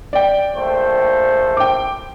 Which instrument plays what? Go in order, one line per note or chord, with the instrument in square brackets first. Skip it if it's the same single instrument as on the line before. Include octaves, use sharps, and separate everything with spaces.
[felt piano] D5 G5
[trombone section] A#1 A3 C5
[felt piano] G5 D6